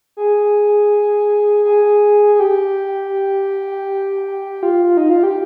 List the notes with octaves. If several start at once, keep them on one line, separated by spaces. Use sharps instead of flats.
G#4
G#4
G#4
G4
F4
D#4
F4
G4